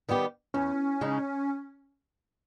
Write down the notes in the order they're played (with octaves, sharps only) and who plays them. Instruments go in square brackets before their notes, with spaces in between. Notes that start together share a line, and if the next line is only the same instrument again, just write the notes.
[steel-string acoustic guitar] D#3 G3 B3 G4
[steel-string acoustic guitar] E2 [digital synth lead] C#4
[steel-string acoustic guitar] C#3 G#3 D#4